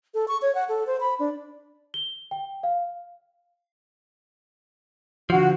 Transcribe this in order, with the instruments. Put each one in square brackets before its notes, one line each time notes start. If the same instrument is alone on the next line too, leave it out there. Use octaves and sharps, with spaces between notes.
[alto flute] A4
C#6
C#5
F#5
A4
C5
B5
D4
[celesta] G7
G5
F5
[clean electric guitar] D3 F3 [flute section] F#4